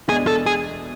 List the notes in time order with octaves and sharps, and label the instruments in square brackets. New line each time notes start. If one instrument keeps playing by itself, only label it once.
[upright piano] E2 B2 G#3 D4 [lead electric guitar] G#4
[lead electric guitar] A4
G#4